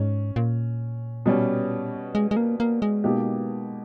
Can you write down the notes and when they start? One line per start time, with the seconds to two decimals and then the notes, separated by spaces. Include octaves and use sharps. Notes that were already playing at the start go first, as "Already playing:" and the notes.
Already playing: G#2 C#4
0.36 A#2
1.26 B2 G3 C#4
2.15 G#3
2.31 G#3
2.37 A#3
2.60 A#3
2.82 G#3
3.04 B2 A#3 D#4 G4